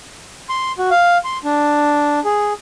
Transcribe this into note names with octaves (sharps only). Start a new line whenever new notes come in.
C6
F#4
F5
C6
D4
G#4